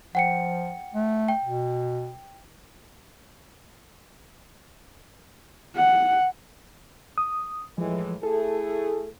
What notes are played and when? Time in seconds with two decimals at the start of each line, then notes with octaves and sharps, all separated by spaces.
0.15 F3 F#5 G5 C#7
0.95 A3
1.28 G5
1.45 B2
5.76 F#5
7.18 D#6
7.78 A2 E3 F3 G#3
8.23 A3 E4 G#4 A4